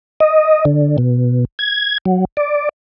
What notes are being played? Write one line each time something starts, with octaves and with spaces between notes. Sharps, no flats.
D#5
D3
B2
G#6
F#3
D5